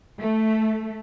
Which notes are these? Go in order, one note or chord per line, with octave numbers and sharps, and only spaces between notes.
A3